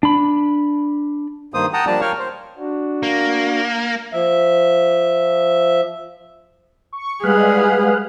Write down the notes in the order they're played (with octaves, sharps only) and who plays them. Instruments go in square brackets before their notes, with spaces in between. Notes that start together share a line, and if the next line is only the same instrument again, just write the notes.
[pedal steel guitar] D4 B5
[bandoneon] G2 D#3 A#3 C5 D#6
F#5 G5 A5 A#5 D#6
F3 G3 A#3 D4 D5 A5
A#4 C#5 F5 G5 C#6 F6
C5
[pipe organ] D4 F#4
[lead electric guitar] A#3
[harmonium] F3 E5
[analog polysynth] C#6
[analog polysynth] G3 G#3 [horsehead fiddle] G#4 [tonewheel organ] B4 F5 F#5